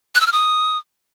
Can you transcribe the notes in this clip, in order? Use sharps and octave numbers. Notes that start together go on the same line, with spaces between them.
F#6
E6
F6
D#6